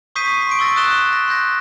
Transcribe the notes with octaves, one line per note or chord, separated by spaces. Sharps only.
C#6 D#6 G6 B6 C7 D#7
C6 C#6 D7
C6 C#6 E6 A6 A#6
D#6 F#6 A6 E7 G7
A#6
C6 F#6 G6 A#6